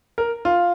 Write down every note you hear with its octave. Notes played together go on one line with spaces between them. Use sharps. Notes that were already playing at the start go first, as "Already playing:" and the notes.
A#4
F4